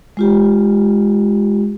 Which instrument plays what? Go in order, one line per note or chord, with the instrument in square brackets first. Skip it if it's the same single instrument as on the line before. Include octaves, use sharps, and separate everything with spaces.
[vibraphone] G#3 F4 G4